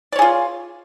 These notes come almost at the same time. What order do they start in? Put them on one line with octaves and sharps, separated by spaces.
D5 C#5 G#4 F4